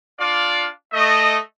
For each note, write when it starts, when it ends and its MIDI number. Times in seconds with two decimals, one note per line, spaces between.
0.19 0.68 62
0.19 0.68 65
0.19 0.68 74
0.19 0.68 77
0.92 1.37 57
0.92 1.37 75